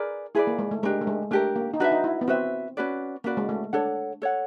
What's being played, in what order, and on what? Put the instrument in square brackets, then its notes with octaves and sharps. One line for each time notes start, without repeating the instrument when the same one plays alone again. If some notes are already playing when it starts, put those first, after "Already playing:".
Already playing: [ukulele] G#4 B4 D5 [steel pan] A#4
[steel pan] E4 [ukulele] G#4 B4 D5
[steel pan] A#3
G#3
A3
[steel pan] G#3 [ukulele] D4 G4 A#4
[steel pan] A3
G#3
[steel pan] A3 [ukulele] D4 G4 A#4
[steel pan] A#3
D#4
[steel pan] D4 [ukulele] F#4 B4 E5
[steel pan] D#4
E4
B3
[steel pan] C4 [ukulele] F#4 B4 E5
[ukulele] C#4 F#4 B4 D5
[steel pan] A#3 [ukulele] C#4 F#4 B4 D5
[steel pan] G#3
A3
[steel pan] D4 [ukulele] A4 C#5 F#5
[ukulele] A4 C#5 F#5